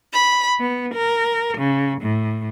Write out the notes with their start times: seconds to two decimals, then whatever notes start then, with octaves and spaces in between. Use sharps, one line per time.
0.12 B5
0.60 B3
0.94 A#4
1.57 C#3
2.01 A2